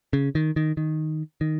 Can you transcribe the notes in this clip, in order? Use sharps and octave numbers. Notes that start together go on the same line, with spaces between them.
C#3
D#3
D#3
D#3
D#3